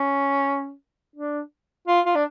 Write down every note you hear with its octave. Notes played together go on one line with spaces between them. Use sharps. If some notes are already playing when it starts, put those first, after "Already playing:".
Already playing: C#4
D4
F4
F4
D4